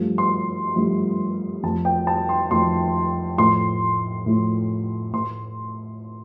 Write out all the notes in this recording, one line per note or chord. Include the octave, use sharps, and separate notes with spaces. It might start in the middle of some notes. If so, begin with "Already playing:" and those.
Already playing: G2 F3 A3
C6
G2 F3 A3
F2 F3 A3 A5
G5
A5
C6
F2 F3 A3 C6
A2 F3 A3 C6
A2 F3 A3
A2 A3 C6